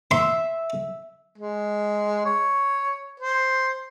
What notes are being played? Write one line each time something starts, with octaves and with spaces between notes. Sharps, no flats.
E5 C6
G#3
C#5
C5